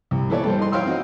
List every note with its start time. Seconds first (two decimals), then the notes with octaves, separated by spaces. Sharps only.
0.11 C2
0.30 E3 E4 A4 C#5 D5
0.44 G2 A4 C5
0.59 D#4 C6
0.72 E4 C#5 F5 G5 C6 E6
0.86 C4 D#4 F#4